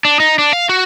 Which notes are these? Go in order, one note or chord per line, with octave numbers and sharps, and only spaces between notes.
D4
D#4
D4
F5
F#4